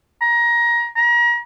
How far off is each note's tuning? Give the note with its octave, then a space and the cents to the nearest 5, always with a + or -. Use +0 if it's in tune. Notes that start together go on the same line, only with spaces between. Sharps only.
A#5 +20
A#5 +35